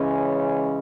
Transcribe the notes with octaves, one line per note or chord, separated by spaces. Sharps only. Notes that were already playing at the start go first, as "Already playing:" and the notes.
Already playing: C#3 E3 G#3 C#4